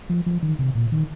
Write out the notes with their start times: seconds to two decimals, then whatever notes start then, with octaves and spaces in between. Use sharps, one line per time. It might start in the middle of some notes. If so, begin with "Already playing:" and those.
0.10 F3
0.26 F3
0.42 D#3
0.59 C3
0.75 A#2
0.92 D#3